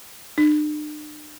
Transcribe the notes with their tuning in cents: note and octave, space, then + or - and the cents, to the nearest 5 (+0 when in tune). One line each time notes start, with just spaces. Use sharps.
D4 +45